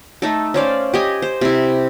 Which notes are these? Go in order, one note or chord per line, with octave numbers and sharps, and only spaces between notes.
A3 D#4 A4
C#4 C5 D5 F5
G4 D#5 G#5
C5
C3 E4